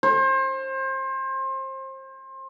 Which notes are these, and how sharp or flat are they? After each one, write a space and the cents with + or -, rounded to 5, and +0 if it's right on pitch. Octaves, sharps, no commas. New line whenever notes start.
C5 +30